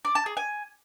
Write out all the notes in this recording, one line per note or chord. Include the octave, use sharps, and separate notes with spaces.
D5
A5
G#4
G#5